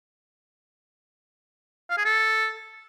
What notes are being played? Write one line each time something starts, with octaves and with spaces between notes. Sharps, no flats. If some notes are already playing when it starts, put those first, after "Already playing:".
F5
G#4
A4